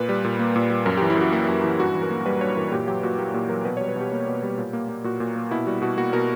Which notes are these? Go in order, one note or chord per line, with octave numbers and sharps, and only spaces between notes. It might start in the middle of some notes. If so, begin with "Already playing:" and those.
Already playing: A#2 B4
G3
A#2
A#3
A#2
G3
F#2 A#4
G4
E3
E4
F#2 F#4
A#3 E4
F#2
E3
G2 F#4
E3
A#4
A#3
G3 B4
G2 C#5
E3 A#4
A#2 G4
F#3 G4
A#2 F#4
A#3 G4
A#2 G4
F#3 A#4
B2 B4
C#5
G3
B4
B2 G4
A#3
B2
G3
A#2
A#3
A#3
A#2 F#4
A#2
A#3
B2 E4
G3 F#4
B2 F#4
A#3 F#4
B2 A#4